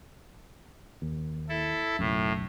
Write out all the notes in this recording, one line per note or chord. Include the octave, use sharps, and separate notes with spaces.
D#2
E4 A4
F#1 B1 F#2 A2